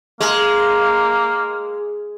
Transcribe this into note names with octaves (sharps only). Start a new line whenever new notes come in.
G#3 A#3